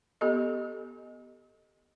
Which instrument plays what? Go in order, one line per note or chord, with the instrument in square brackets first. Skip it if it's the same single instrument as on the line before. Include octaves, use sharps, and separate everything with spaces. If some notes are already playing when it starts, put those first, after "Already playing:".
[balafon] B3 G4 A4 D#5